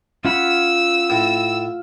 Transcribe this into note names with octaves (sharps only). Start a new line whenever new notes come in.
C#4 F4 F#5 B5 E6
A2